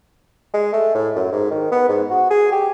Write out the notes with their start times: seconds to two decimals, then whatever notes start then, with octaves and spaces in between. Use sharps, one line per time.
0.54 G#3
0.73 A3
0.95 A2
1.16 F#2
1.32 G#2
1.51 D#3
1.72 B3
1.89 G#2
2.10 F#4
2.31 G#4
2.52 G4